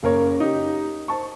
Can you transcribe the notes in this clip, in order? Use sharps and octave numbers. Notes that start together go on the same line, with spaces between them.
F#1 A#3 A#4 C#5
D#4 G4
C5 A5 C#6